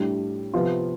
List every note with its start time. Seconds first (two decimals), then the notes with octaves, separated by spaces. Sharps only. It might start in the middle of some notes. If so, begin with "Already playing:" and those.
Already playing: A2 G3 D4
0.54 C3 F3 B3 F4